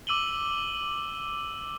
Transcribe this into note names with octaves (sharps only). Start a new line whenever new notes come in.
D6 E6 D#7 F#7 G7